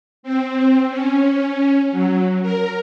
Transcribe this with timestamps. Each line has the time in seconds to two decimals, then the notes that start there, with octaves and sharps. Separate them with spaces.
0.23 C4
0.89 C#4
1.91 F#3
2.42 A#4